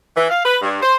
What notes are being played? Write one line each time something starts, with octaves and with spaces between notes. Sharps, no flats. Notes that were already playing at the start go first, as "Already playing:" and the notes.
E3
F5
B4
G2
C5